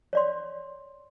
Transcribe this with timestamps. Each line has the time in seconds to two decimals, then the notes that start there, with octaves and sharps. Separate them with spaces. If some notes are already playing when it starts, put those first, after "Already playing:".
0.13 C#5 D5 C6